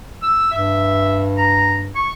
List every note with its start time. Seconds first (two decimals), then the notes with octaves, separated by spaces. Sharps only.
0.23 E6
0.52 G2 E5
1.38 A#5
1.95 C#6